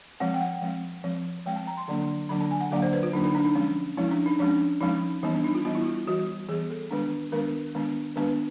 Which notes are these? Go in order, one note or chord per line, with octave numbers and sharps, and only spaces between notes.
F3 G#3 C4 F#5
G5
F#5
F3 G#3 C4
F3 G#3 C4
F3 G#3 C4 G5
A5
A#5
C6
D3 F#3 A#3 D4
D3 F#3 A#3 D4 B5
A5
G#5
F#5
D3 F#3 A#3 D4 F5
C5
B4
F4
D3 F#3 A#3 D4 D#4
D#4
D4
D#4
F3 G#3 C#4
F3 G#3 C#4 E4
D4
D#4
F3 G#3 C#4 D4
F3 G#3 C#4 D#4
E3 G3 B3 D#4
D4
D#4
F4
E3 G3 B3 F4
E4
F4
F4
E3 G3 B3 F#4
E3 G3 B3 G#4
A4
D#3 G#3 B3 D4
D#3 G#3 B3 D4 A#4
D#3 G#3 B3 D4
D#3 G#3 B3 D4 B4